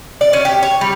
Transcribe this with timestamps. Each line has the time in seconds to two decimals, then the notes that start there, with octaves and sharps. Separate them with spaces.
0.21 D5
0.33 C#4
0.45 G4
0.63 C#5
0.81 G3